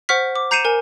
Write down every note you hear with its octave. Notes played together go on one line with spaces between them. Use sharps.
C5 F#5 C#6 F6 B6
D6
A#5 G6 C7 C#7 D#7 E7
A#4 G#5